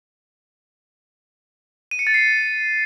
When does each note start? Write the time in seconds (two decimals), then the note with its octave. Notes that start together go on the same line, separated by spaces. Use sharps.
1.91 D#7
1.99 C#7
2.07 A6
2.14 C7